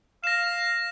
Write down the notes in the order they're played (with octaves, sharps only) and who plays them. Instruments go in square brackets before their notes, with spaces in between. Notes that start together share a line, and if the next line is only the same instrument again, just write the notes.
[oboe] F5 [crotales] A#6 E7